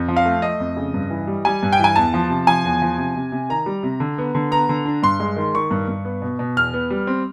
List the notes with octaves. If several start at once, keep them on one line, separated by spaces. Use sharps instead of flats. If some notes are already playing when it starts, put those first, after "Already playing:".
Already playing: F2
F3
F5
A3
A3 D#5
F2
C#3
G2
E3
G3
G3 G#5
G2
G5
E3 G#5
E2 A5
F3
C3
F3 G#5
E2
F3
C3
C3
C3
D#3 A#5
G3
C3
D3
B3
D3
B3 A#5
D3
D4
G2 C6
G#3
D#3
D#3 C#6
G2
G2
B3
B2
B2
E2 F6
B3
G3
C4